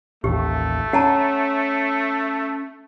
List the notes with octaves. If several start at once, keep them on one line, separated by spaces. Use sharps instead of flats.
A1 D#2 A3 G4
C#4 F#5 A5 A#5